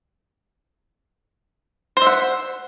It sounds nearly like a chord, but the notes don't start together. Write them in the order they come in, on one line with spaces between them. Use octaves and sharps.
C5 E5 F#5